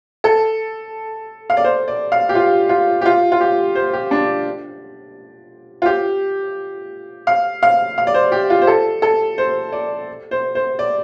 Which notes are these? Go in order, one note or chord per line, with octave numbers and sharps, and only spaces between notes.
A4
F5
D5
C5
D5
F5
G4
F4
F4
G4
F4
F4
G4
C5
G4
D4
F4
G4
F5
F5
F5
D5
C5
G4
F4
C5
A4
A4
C5
D5
C5
C5
D5